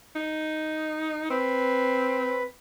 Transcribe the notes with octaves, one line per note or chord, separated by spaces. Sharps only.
D#4
C4 B4